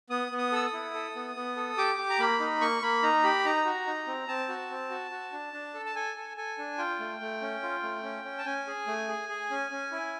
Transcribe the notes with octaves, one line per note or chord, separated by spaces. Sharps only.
B3 D#6
B3
D#6
A4 E6
D#6
E4
A4
B3
B3
A4
G4 D6
G4
A#5
A#3 B5
D#4
A#3 C#6
A#3 B5
D#4 A#5
G4 B5
D#4 A#5
F#4
D#4
C4
C4 A5
F#4
C4
F#4
F#4
D4
D4
A4
A5
A4 G#5
A4
A4 G#5
D4
F4 G5
A3
A3
C#4
F4
A3
C#4
C#4
A5
C#4 G#5
G#4
A3
G#4
G#4
C#4
C#4
E4